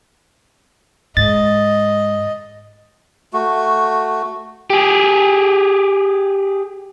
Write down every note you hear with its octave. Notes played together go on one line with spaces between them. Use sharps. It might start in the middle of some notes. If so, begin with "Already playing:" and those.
G#2 D#5 A6
A3 F#4
G4 G#4